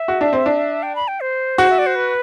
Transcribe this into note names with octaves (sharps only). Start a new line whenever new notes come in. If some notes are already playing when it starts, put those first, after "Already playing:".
Already playing: E5
F#4
D4
C4
D4
G5
B5
G5
C5
F#4
E5
D5
C5
B4